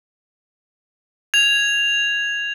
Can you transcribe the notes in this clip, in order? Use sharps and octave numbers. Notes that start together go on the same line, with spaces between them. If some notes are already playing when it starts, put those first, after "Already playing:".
G#6 F7